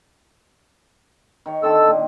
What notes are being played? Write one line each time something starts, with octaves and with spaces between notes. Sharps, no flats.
D#3 C#5
D3 D#3 C4 A4 E6
A#2